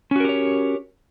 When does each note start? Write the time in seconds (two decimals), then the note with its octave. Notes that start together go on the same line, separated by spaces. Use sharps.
0.11 C#4
0.16 F#4
0.20 A#4
0.25 G4
0.29 C#5